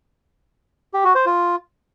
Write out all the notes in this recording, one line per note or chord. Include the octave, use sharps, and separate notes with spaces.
G4
F#4
C5
F4